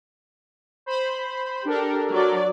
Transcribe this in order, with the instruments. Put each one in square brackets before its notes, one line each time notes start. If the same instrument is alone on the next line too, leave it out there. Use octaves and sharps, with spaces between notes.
[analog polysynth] C5 B5
[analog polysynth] D4 A4 A#4 [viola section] G4
[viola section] F#3 D5